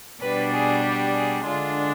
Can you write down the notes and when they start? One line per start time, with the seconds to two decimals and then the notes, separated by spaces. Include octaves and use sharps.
0.22 B2 G3 D4 B4
0.53 G#4
0.84 G4
1.15 G#4
1.46 D3 G#3 D4 F4